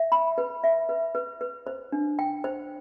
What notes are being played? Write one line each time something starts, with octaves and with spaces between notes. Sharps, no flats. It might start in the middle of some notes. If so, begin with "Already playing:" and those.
Already playing: E5
B5
B4
E5
B4
B4
B4
C5
D4
G5
C5